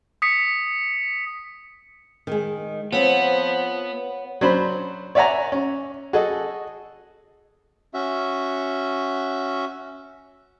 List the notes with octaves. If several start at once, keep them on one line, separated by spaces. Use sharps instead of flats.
D#6 B6 C#7
D#3 G#3
F3 B3 C4 C#5 F#5
F#3 D4 C5 B5
C#5 D5 E5 F#5 G#5 A#5
C#4
F#4 G#4 A4 D#5
C#4 F#4 E5